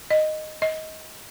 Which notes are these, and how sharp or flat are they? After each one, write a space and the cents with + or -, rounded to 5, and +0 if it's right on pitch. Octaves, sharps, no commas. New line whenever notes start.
D#5 -10
D#5 +20